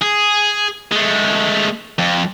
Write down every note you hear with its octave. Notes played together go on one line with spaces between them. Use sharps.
G#4
G#3 A3
F2